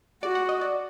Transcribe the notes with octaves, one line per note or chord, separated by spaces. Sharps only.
F#4 D5
F#5
D#5
D5